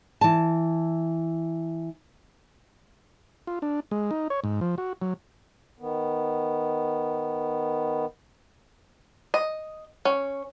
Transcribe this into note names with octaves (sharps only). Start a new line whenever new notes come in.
E3 A5
F4
D4
G#3
D#4
C#5
G#2
F3
F#4
F#3
D#3 B3
D#5
C#4